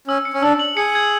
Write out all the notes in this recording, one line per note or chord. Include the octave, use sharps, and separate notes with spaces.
C#4 E6
C#7
C#4
D4 E6
F#7
G#4 C#7
G#6